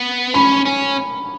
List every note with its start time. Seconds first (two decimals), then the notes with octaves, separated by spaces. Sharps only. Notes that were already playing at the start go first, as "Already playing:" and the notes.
Already playing: B3
0.34 C#4 B5
0.65 C#4